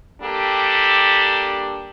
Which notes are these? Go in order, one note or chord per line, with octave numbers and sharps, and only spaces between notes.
G3 A#3 D4 G4 A4